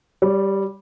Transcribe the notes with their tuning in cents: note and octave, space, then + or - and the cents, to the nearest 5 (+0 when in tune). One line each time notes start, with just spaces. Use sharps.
G3 +0 C#5 +35